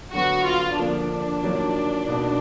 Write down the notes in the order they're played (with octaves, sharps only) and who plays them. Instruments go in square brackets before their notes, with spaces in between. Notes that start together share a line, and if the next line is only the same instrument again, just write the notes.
[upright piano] D3 F#3 B3 [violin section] F#4
[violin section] F4
[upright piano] D3 F3 A#3 [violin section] D4
[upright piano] D#3 F#3 A#3 F4
B2 A#3 D#4 F#4